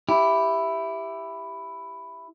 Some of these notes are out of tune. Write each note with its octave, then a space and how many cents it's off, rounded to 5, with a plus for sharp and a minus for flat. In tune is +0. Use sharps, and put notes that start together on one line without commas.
E4 +5 G4 +0